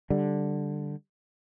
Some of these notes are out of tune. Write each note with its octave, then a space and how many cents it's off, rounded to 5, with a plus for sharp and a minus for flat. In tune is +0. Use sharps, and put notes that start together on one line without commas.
D3 +0 G3 +0